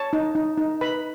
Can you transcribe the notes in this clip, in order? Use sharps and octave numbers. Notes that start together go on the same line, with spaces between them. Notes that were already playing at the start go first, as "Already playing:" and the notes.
Already playing: C#5 A5
D#4
D#4
D#4
B4 B5